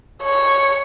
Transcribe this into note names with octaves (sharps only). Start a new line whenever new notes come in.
C#5